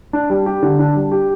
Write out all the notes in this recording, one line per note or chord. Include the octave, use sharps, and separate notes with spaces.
D4
G3
G4
D3
D4
G3
G4